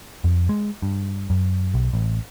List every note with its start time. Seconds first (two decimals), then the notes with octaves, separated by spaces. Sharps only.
0.24 F2
0.49 G#3
0.82 G2
1.30 F#2
1.74 B1
1.93 A1